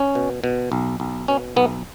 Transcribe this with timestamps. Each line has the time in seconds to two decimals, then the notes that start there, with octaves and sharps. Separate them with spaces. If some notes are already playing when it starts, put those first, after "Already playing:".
Already playing: C#4
0.15 B2
0.44 B2
0.72 B1
1.00 B1
1.28 B2 C#4
1.56 B1 B3